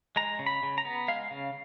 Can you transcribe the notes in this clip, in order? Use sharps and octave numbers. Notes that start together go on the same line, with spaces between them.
G#3 A#5
C#3
B5
C#3
A#5
B3
G#3 F5
C#3